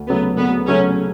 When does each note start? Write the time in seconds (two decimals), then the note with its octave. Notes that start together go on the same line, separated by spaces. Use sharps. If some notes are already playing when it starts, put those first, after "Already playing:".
Already playing: D2
0.08 C#3 F#3 A3 B3
0.38 D2 B3
0.66 C#3 F#3 A3 C#4